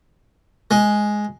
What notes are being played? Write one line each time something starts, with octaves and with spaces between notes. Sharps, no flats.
G#3